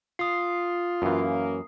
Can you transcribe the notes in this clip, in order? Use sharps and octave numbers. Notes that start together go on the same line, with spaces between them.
F4 D#6 C7
F#2 E3 A#3 C#4